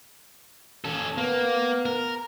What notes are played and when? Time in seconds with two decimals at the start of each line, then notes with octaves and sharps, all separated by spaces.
0.85 C#4 A4
1.18 A#3 B3
1.86 A#4